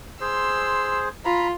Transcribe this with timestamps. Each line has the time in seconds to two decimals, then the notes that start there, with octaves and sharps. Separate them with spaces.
0.21 G#4 C5 C6 E6
1.25 F4 A#5 B5